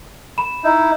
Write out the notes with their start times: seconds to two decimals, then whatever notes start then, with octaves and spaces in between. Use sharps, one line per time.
0.38 B5 E7
0.64 D#4 E4